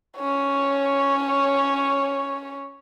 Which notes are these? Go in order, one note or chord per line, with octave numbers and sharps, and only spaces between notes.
C#4 C#5